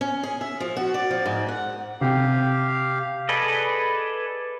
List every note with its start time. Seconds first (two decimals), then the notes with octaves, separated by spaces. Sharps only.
0.01 C#4
0.23 G#4
0.41 E5
0.60 F3
0.77 F#4
0.94 D5
1.11 F3
1.26 G#2
1.48 F#5
2.01 C3 C4 G4 F5 G5
3.29 G#4 A4 B4 D5 D#5